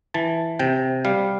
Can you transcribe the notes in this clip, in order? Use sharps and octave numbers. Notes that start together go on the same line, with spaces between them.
E3 A5
C3 G5
G3 F5